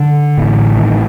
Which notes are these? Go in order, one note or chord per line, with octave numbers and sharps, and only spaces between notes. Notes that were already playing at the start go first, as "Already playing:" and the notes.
Already playing: D3
A1 A2
D#3